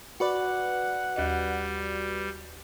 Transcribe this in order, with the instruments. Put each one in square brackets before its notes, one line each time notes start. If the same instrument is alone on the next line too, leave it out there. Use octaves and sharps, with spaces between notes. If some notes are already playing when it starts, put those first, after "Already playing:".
[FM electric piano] F#4 B4 D5 [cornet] F#5
[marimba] D#2 D#5 [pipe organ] G3